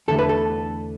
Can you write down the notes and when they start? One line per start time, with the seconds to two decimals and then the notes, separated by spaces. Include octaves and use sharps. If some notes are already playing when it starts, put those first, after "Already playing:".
0.08 E2 D3 A3 A4
0.19 B4
0.29 A4